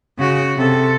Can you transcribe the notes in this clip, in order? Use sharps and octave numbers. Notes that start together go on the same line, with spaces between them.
C#3 F#4
C3 A4